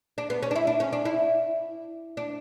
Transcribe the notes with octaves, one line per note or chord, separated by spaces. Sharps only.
D4
B3
C#4
D4
E4
D4
C#4
D4
E4
D4